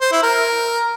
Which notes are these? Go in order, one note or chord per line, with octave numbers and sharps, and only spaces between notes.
C5
E4
A#4